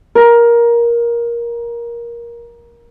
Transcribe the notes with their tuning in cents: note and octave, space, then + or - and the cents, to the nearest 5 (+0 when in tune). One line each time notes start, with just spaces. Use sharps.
A#4 +15